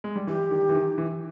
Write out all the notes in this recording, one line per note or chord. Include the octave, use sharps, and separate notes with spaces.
G#3
G3
E3 G4
D#3
E3
D#3
E3